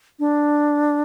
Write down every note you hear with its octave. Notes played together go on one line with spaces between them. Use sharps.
D4